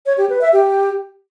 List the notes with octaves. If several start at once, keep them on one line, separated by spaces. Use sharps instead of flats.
C#5
G4
B4
E5
G4